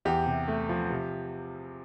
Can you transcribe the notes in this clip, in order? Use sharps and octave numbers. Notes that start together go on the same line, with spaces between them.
E2 G4
C3
A3
F3
C3